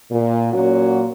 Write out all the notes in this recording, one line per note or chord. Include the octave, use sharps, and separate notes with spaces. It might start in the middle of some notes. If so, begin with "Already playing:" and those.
A#2
A#2 F#3 A#3 C#4 F#4